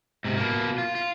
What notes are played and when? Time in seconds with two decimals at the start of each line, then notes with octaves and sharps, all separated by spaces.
0.24 G#2 C3
0.37 B2 A#3
0.78 F4
0.95 F4